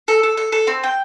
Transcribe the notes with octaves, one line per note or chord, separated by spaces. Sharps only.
A4
A4
A4
A4
C4
G5